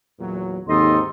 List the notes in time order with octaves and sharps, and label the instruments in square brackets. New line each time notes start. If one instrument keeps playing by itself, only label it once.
[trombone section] E2 A#2 F#3
[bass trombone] D#2 [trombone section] G#2 C4 D#4 [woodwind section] A4 D#5 C6